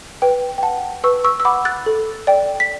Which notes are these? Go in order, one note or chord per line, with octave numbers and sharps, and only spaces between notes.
B4 G5
G5
F#5 A5
B4 C#6 E6
C#6 E6
E6
F#5 B5 D6
F#6 A6
A4
D5 G5
B6